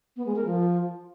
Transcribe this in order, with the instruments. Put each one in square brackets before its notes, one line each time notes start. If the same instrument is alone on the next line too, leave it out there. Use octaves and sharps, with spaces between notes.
[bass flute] B3
G#3
A#4
F3